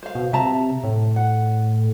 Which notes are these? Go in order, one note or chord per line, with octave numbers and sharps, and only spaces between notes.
C5 F5
B2
C3 E5 A5 A#5
A2
F#5